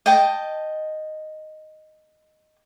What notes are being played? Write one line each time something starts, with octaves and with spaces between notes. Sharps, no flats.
D#5 G5 A5